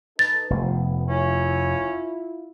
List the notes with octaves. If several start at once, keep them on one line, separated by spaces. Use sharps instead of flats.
D#4 A4 B4 A6
F1 F3 A3 B3
C#4 E4 F4